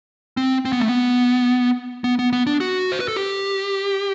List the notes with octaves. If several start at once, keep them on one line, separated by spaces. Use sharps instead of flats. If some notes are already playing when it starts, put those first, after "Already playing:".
C4
C4
B3
A3
B3
B3
B3
B3
D4
F#4
C5
B4
A4
G4